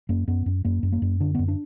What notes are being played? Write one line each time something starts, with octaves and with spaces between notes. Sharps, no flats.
F#2 A#3
F#2 B3
F#2
F#2 A#3
F#2
A#3
F#2
D3 D4
F#2 B3
D4